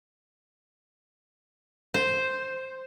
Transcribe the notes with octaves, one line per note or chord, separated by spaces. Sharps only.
C5